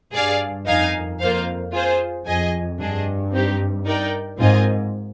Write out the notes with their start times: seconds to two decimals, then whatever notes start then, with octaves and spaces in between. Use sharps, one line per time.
0.13 G2 G#4 D5 F5
0.66 F2 D#4 A#4 F5 G#5
1.19 F2 A#3 F4 C5 F5
1.72 F4 G#4 C5
2.26 F2 G#4 D#5 G#5
2.78 G2 D4 G#4 D#5
3.32 C4 D#4 G4
3.85 D#4 A#4 D5 G5
4.39 G#2 C4 F4 A#4 D#5 G#5